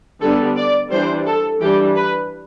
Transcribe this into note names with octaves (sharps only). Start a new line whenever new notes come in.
D3 G3 B3 D4 A4
D5
E3 G3 D4 C5
A4
E3 G3 D4 G4
B4